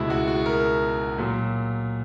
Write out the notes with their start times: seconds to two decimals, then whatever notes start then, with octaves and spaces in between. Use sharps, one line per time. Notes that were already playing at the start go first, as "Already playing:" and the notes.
Already playing: C#2 B2 G#3 E4
0.10 F#4
0.28 F#4
0.46 A#4
1.18 A#2 F#3